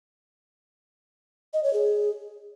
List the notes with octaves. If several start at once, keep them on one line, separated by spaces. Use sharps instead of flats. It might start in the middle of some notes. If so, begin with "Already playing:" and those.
D#5
C#5
G#4